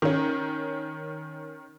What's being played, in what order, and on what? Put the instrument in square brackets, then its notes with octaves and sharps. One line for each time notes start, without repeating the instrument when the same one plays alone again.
[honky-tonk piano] D#3 C#4